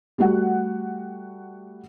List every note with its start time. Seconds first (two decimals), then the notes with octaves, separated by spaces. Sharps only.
0.18 G3 A3 F#4 F#5